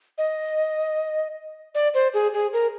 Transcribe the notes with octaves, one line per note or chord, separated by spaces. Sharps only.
D#5
D5
C5
G#4
G#4
A#4